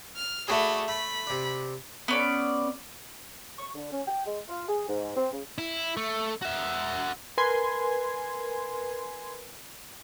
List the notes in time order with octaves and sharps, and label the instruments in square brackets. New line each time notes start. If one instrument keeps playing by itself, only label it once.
[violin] F6
[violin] A3 B5 [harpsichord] D4 F#4 G#4
[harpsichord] A3 [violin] B5
[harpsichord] C3 D4
[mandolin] B3 C#4 D5
[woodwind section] C#6
D3
C#4
G5
G#3
F4
G#4
G#2
C4
C#3
[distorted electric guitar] E4
A3
F#4 E5
[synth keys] A#4 B4 G#5 C6 G#6